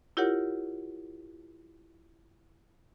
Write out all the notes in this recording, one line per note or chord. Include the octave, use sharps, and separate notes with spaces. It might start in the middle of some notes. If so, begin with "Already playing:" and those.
E4 F4 G4 A#4 C#5 F#5